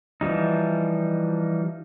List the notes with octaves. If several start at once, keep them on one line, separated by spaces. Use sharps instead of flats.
E3 F3 G3 D#4